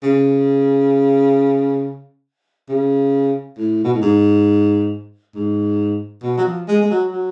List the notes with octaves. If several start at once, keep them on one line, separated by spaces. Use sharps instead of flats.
C#3
C#3
A2
B2
A2
G#2
G#2
B2
F#3
F3
G#3
G#3
F#3
F#3